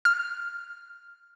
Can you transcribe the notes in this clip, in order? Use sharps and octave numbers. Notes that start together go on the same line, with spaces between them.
F6